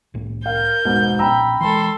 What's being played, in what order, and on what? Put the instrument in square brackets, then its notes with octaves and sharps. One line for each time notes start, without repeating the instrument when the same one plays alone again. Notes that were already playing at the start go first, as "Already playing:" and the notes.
[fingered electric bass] C2 A2
[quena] A#4 [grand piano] F5 [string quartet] G6
[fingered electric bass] E1 [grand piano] G#2 B2
[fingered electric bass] B1 A#2 C#4 [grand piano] G5 A#5 E6 [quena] B5
[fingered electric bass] E3 G#3 [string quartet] A4 C6